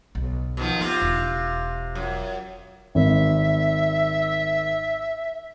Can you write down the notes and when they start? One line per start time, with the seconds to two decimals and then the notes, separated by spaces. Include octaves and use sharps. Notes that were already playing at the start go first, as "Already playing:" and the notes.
0.15 B1
0.57 B2 D#3 F3
0.81 C3 B3 F4
1.02 E1
1.95 F#2
2.95 G#1 E5